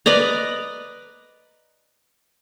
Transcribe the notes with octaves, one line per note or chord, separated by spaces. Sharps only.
B4 D5 D#5 A#5